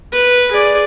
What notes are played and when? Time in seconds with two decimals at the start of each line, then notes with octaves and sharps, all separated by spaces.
0.12 B4
0.51 G#4 D5